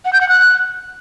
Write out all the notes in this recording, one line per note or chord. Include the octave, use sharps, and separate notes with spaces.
F#5
G6
F#5
F#6